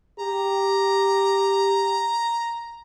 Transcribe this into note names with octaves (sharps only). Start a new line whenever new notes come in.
G4 A#5